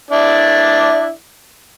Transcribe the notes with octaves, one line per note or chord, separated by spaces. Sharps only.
D4 E4 D5